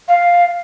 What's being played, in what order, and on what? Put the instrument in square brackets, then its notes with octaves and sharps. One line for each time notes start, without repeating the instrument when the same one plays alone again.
[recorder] F5